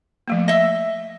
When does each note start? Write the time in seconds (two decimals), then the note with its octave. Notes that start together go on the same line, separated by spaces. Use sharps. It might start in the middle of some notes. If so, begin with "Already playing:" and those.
0.28 F3 A3 A#3
0.48 D#5 E5